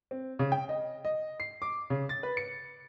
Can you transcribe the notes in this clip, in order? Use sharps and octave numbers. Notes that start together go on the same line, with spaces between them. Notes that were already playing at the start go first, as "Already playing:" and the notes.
C4
C#3
G5
D#5
D#5
C7
D6
C#3
A6
B4
C#7